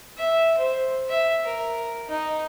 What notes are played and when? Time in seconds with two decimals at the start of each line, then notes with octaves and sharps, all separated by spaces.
0.17 E5
0.57 C5
1.10 E5
1.44 A#4
2.08 D#4